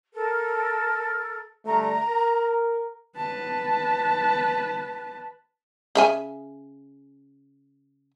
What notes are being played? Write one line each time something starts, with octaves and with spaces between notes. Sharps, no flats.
A4 A#4
D3 G3 A3 A#5
A#4
B4 A5
C#3 E5 G#5